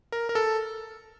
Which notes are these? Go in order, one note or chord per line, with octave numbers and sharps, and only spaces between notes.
A#4
A#4
A4